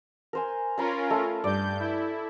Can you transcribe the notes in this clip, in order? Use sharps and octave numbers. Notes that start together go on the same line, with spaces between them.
A#4 C5 G#5
C#4 F4 A#4 A#5 B5
A3
G2 D5 G6
E4